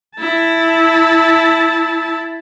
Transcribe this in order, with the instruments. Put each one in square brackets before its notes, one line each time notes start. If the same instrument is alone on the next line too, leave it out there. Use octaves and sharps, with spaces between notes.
[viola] E4 A5